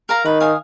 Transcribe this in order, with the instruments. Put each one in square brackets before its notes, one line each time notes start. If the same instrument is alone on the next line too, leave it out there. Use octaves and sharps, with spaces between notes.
[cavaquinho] A#4 F5 A#5
[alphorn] D#3 [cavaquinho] B4
[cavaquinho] F5 G#5 D#6